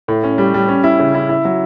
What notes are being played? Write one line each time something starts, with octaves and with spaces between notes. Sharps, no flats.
A2
C#4
G3
G3
C#4
E4
C#3
E4
E4
F#3